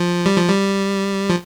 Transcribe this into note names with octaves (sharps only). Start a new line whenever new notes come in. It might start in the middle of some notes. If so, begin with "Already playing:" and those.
Already playing: F3
G3
F3
G3
F3